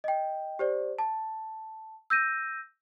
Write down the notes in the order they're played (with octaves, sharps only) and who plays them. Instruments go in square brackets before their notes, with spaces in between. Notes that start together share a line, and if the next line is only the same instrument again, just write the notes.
[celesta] D#5 G5
G4 C5 D5
A5
E6 G6 A#6 D#7